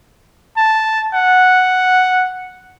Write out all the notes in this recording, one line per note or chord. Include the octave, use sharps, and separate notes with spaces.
A5
F#5